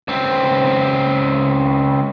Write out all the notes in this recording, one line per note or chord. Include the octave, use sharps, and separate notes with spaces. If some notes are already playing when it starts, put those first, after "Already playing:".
C#2 C4